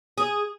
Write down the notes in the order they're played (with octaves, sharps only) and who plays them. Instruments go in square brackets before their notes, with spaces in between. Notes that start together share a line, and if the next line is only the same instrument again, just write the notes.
[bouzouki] G#4